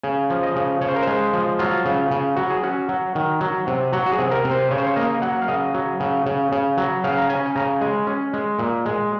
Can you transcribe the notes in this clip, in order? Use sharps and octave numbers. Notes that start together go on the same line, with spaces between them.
C#3 G#5
F3
D#5
C#3
C#3 C#5
C5
A#4
G#3 C5
F3
F#3 F4
C#3
C#3
F#3 F#4
G#4
C#4 F#4
F#3
D#3
F#3
C3
F#3 F#4
F#4
G#4
C3
A#4
C3
C5
C#3 C#5
C5
C#5
A#3 D#5
F#3 F#5
F5
C#3 D#5
F#3
C#3
C#3
C#3
F#3
C#3 F5
A#5
C#4 G#5
G#5
C#3 A#5
G#3 G#5
C#4
G#3
A#2
G#3